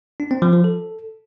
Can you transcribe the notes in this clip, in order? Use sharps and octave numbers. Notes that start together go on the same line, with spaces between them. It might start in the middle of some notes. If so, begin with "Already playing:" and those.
D4
C4
F3
F3
A4